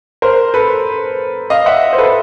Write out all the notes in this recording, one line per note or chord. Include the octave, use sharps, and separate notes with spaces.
A#4 C5
A4 B4
D#5 F5
E5 F#5
C5
A4 B4